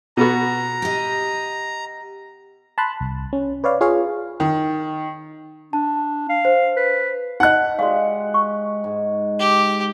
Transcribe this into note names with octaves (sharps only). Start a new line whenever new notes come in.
B2 B3 F#4 A#5
G4 D#5
A5 B5 C6 F#6
C2
C#4
B4 C#5 D5 F5
F4 G#4 C#5 F5
D#3
D4 A5
F5
C5
B4
D#4 D#5 F#5 F#6
G#3 F#4 G4 D5 F5
C#6
G#2
G4